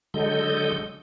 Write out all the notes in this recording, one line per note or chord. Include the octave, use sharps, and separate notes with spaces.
D3 F#3 G#3 A4 D#5 G6